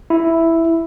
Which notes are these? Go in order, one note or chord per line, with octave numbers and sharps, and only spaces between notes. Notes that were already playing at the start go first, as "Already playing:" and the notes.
E4